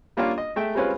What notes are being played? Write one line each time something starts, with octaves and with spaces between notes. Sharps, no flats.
G3 A#3 C#4 D4 F4
D#5
G#3 A3 E5 G5
G3 G#3 C4 C#4 F4 B4